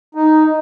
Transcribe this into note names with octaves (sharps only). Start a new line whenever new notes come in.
D#4